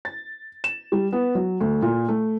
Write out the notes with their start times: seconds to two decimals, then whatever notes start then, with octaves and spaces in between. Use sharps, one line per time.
0.05 A6
0.64 E7
0.92 G3
1.12 B3
1.35 F#3
1.60 D2
1.82 A#2
2.08 A3